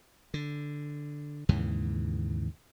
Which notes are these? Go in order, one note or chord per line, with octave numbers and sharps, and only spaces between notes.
D3
D#2 G#2 C#3 E3